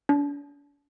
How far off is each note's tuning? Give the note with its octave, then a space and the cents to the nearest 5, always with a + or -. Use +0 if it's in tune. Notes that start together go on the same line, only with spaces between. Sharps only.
D4 -40